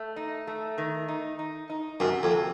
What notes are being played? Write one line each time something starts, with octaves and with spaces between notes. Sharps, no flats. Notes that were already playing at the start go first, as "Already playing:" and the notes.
Already playing: A3
D#4
A3
D#3
D#4
D#4
D#4
F#2 C3
F2
C3